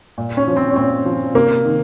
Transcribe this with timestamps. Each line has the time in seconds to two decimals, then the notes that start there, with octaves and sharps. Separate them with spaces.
0.18 A#2
0.37 C#4
0.47 F3
0.57 C4
0.71 C#4
0.76 A#2 C4
1.05 F3
1.34 C3 A#3
1.65 D#3